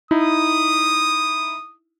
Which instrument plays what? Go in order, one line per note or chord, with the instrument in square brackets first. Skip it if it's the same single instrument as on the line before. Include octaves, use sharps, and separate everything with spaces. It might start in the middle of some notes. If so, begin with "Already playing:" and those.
[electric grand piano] D#4 E4 [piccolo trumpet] D#6